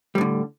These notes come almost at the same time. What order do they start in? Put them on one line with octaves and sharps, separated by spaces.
G3 A2 D3